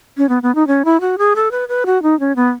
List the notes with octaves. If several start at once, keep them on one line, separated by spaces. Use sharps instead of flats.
C#4
B3
B3
D#4
C#4
E4
F#4
G#4
A4
B4
B4
F#4
D#4
C#4
B3